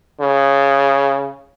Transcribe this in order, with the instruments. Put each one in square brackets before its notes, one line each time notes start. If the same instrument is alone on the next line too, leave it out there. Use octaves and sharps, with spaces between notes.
[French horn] C#3